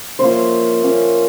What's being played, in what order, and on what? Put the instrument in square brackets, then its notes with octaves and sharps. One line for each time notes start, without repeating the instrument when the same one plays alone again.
[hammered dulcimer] F3 A#3 C#4 E4 [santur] C5
[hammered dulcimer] F3 A#3 C#4 E4